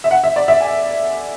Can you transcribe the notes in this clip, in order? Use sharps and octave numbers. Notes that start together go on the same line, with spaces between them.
E5
F#5
E5
D5
E5
G#5